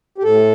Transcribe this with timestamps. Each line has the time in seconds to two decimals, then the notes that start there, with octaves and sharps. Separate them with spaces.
0.18 G4
0.23 A2 A4